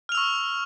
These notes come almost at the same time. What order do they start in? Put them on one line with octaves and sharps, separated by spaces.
F6 F7 E6 C#6